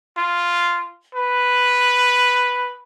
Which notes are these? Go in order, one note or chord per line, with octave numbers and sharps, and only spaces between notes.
F4
B4